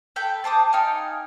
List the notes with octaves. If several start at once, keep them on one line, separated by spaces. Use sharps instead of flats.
A4 B4 G5
C4 A5 D6 D#6
D#4 F5 G5 G#5